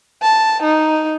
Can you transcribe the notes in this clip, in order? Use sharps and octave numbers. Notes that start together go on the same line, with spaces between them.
A5
D#4